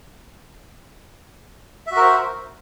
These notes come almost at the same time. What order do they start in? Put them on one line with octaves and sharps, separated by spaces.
E5 F#4 A#4 C5